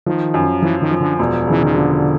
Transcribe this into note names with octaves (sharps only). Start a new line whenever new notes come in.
D#3 F3
F#2
E3 F3
D#3
F3
D3
E1
C#3 E3
D#3
D3 F3